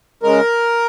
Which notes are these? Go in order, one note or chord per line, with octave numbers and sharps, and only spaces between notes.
C#3 G#3 A#4